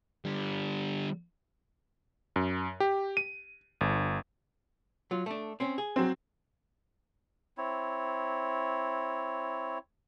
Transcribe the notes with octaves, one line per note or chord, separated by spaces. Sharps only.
D3 G3
F#2
G4
D#7
G1
F#3 F4
A3 D4
C4 C#4
G#4
F#3 C4
C4 E4 C#5